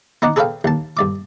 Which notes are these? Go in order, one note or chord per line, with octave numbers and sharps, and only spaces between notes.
B3 D#4 D5 F#5
G#4 A4 B4 C#5 F5 G5
D#2 A5
G2 D5 D6